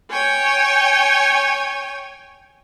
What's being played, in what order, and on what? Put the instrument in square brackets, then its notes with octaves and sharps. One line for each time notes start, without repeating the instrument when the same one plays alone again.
[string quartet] C#5 G5 G#5